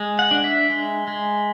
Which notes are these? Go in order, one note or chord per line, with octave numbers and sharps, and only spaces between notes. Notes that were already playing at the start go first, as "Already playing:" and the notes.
Already playing: G#3
F#5
D4
E5
G#3
G#3